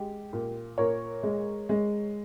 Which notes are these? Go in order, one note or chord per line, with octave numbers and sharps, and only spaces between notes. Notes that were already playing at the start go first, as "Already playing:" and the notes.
Already playing: G#3 G4
A#2
A#2 A#4 C#5
G#3
G#3